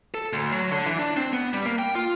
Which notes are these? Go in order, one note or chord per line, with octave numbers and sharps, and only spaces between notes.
A4
D2
F#3
D3
E3
D4
C4
B3
G3
A#3
G5
F4